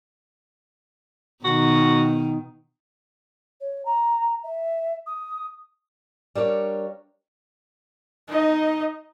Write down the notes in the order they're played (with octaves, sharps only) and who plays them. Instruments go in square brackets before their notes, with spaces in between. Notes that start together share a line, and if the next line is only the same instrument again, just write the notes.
[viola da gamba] B2 D#3 [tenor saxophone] F#4
[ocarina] C#5
A#5
E5
D#6
[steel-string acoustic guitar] G3 D4 A#4 C#5 F5
[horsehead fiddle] D#4 D#5